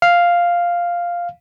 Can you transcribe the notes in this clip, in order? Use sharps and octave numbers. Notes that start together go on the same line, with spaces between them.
F5